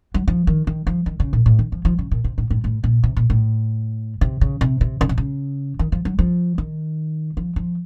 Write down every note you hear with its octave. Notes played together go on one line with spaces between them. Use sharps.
F#3
F3
D#3
D#3
F3
D#3
C#3
A#2
A2
D#3
F3
F3
C#3
A#2
C3
A2
A2
A2
A#2
C3
A#2
A2
C3
C#3
C3
C3
C#3
C3
C#3
D#3
F3
F#3
F3
D#3
F3
F3